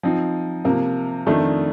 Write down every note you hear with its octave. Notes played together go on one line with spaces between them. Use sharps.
F3 C4 D#4
C3 F3 A#3
F2 D#3 A3 D4